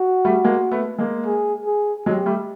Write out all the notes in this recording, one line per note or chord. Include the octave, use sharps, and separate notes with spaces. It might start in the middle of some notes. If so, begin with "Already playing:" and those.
Already playing: F#4
G3 A3
G#3 A#3
A3 B3
G#3 A#3
G#4
G#4
F#3 G#3 G4
G3 A3